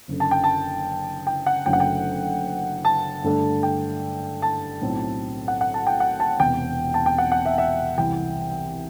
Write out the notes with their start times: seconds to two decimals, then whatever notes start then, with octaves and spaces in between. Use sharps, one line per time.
0.08 F#1 F#2 D3
0.20 A5
0.31 G5
0.44 A5
1.27 G5
1.46 F#5
1.66 F#1 F#2 D3 F#3 A3 G5
1.73 F#5
1.80 G5
2.85 A5
3.24 G2 D3 A3 D4
3.63 G5
4.42 A5
4.81 B1 A2 F#3 C4
5.48 F#5
5.61 F#5
5.74 A5
5.87 G5
6.00 F#5
6.20 A5
6.40 E1 E2 C3 E3 B3 G5
6.94 A5
7.06 G5
7.18 F#5
7.32 F#5
7.45 E5
7.58 E5
7.98 C2 C3 E3 G5